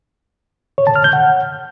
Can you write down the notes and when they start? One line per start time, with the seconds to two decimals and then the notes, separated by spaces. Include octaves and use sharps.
0.78 C#5
0.87 A5
0.96 F6
1.04 G6
1.13 F#5